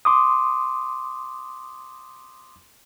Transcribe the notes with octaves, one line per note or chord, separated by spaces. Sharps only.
C6 D6 D#6